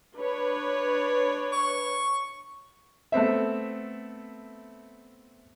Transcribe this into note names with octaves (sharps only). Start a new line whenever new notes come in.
D4 B4 C#5
C#6
A3 B3 C4 E5